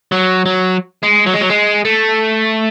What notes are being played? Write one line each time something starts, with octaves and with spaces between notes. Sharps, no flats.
F#3
F#3
G#3
F#3
G#3
F#3
G#3
A3